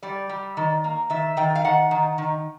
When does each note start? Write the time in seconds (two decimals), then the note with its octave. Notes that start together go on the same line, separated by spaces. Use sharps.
0.02 G3 D5
0.29 G3
0.57 D#3
0.84 A#3
1.10 D#3 E5
1.37 D#3 G5
1.55 F5
1.64 D#3 F#5
1.91 D#3
2.18 D#3